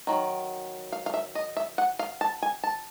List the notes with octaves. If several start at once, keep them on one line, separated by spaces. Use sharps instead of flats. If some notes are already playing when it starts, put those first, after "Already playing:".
D#3 F#3
F5
F5
E5
D#5
E5
F#5
F5
A5
G#5
A5